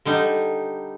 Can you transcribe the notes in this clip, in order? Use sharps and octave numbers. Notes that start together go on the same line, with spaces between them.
D3 G3 D#4